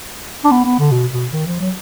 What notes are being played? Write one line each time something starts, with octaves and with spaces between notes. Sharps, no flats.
D4
B3
B3
D3
B2
B2
D#3
F3
F#3